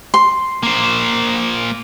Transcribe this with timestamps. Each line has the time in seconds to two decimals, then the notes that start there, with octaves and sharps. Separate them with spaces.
0.14 C6
0.63 A#3 C5